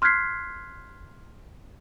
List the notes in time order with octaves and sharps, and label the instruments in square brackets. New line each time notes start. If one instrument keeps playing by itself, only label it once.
[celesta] C6 F6 F#6 G#6 B6 C7